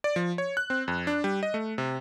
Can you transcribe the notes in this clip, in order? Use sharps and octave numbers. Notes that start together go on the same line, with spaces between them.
D5
F3
C#5
F#6
C4
F2
D4
G3
D#5
A3
C3